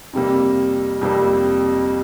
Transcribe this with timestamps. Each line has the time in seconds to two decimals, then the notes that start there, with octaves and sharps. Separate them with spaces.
0.13 F2 C3 G3 A#3
1.01 F2 C3 G3 A#3